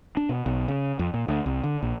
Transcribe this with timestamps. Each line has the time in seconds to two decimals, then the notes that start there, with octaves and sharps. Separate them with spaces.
0.17 D4
0.29 B2
0.46 B1
0.68 C#3
0.99 F2
1.14 A#2
1.28 D2
1.46 C2
1.64 D3
1.82 A#1